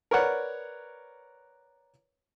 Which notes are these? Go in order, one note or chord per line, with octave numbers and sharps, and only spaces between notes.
A#4 B4 C#5 D5 F#5